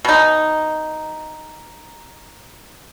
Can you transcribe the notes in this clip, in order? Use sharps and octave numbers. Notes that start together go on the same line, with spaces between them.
B2 D#4